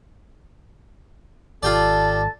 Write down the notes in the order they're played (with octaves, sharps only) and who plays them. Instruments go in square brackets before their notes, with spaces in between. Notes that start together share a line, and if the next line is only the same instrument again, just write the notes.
[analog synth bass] G#1 [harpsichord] F4 G4 D5 [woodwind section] A4 A5